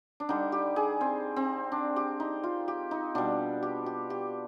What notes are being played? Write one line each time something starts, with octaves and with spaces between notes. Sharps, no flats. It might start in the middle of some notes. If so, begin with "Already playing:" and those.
D4
D3 G3 D#4
G4
G#4
C4
C4
D4
G4
D#4
F4
G4
D#4
B2 G3 D4
G4
G4
G4